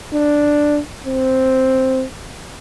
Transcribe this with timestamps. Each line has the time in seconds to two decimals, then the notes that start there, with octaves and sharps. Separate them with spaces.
0.14 D4
1.07 C4